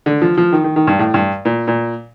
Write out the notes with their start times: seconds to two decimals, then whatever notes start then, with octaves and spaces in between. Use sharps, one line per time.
0.06 D3
0.22 F3
0.37 F3
0.52 D#3
0.64 D#3
0.76 D#3
0.87 G2
0.99 A2
1.14 G2
1.45 A#2
1.68 A#2